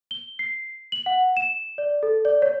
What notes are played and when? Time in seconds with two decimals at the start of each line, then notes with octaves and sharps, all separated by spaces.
0.11 G7
0.39 C7
0.92 F#7
1.06 F#5
1.37 E7
1.78 D5
2.03 A4
2.25 D5
2.42 C#5